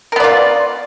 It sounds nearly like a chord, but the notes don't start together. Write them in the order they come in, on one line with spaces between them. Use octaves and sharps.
A#4 B3 D5 F4